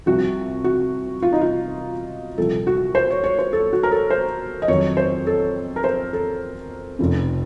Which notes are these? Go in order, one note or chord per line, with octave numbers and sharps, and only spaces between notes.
C2 C3 F3 F#4
F#4
F4
D#4
F4
C2 A#2 F3 A4
F#4
C5
C#5
C#5
C5
A4
F#4
A#4
A4
C5
D#5
F2 D#3 F#3 C#5
C5
A4
A#4
C5
A4
F1 F2 C#3